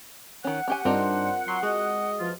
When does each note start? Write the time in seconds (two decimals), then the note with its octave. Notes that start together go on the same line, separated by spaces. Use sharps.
0.44 D#3 C#4 F#5
0.68 C#4 G4 G#5
0.85 G2 C4 D4 D#4 F4 A#4 C5
1.48 F#3 C6
1.63 G#3 F#4 D#5
2.20 E2 F3 F4